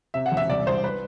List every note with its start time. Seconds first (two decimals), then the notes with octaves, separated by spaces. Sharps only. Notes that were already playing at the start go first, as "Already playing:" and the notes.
0.14 C3 E5
0.26 F#5
0.31 E1
0.37 E5
0.50 C2 D5
0.67 C2 C5
0.84 B4